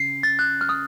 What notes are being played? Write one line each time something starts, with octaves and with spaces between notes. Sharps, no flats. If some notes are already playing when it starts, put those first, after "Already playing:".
Already playing: C#3 C7
A6
F#6
F6
D#6